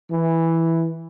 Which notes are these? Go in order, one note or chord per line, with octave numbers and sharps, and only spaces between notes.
E3